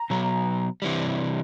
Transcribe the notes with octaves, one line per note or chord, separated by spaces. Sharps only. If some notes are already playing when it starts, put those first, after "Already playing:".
Already playing: A#5
B2 F#3 B3
C3 E3 G3